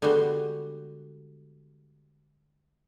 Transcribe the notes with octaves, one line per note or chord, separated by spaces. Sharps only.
D3 G3 G#3 B3 F#4 C5